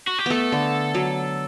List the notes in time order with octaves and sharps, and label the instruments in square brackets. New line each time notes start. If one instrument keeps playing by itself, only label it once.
[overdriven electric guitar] F#4
G4
[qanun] A3 B3 [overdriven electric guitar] A4
[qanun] D3
F#3